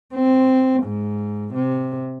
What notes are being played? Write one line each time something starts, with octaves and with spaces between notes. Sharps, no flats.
C4
G#2
C3